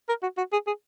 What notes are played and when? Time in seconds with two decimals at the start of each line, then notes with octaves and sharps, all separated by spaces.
0.08 A#4
0.22 F#4
0.37 F#4
0.52 G#4
0.67 G#4